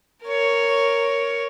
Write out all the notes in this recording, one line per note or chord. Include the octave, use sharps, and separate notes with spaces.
A#4 C#5